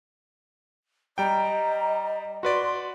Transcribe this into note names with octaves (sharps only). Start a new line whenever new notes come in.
G3 D#5 G5 A#5
F#4 B4 D5 C6